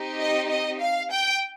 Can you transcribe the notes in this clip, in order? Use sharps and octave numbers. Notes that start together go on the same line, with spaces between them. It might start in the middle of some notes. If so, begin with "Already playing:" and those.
Already playing: C4 D#4 G4
D#5
D#5
F5
G5